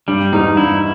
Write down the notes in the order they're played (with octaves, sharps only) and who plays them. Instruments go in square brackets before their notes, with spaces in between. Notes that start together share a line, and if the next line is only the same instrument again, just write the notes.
[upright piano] G2 [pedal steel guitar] G3
[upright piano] E2 G#2 [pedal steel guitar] D#4
[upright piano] G2 [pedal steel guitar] E4